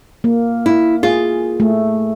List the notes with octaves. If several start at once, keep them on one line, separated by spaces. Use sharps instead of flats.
A#3
E4
F4 G#4
A3